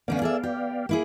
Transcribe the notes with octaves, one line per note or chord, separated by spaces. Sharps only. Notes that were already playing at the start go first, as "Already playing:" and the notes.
D3 A3 B3 C#4 D5 F5
G#4 A4 E5
G4
A#3 E4 G#4